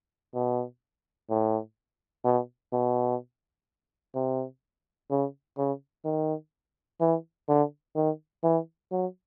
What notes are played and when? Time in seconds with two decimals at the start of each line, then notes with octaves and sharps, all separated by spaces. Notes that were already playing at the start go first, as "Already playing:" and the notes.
0.34 B2
1.30 A2
2.24 B2
2.73 B2
4.15 C3
5.10 C#3
5.58 C#3
6.05 D#3
7.00 E3
7.48 D3
7.96 D#3
8.43 E3
8.91 F#3